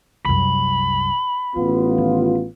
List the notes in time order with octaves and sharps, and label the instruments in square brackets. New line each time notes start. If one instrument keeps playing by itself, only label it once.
[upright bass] C2 F#2 [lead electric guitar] B5
[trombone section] A1 B3 F4 [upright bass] D#4
[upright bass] D#3